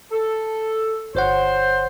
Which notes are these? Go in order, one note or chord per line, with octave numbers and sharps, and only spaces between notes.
A4
G1 C5 C#5 F#5